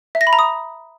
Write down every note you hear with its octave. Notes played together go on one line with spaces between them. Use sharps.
E5
A#6
B5
A#5
D#6